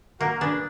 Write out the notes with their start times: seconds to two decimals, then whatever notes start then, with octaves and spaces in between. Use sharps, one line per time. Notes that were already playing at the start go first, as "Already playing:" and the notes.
0.20 A#3 F#4 A#4
0.40 D4 G#4 B4